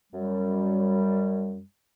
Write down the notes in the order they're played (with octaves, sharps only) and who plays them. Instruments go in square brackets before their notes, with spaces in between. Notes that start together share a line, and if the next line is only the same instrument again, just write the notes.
[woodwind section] F#2 G3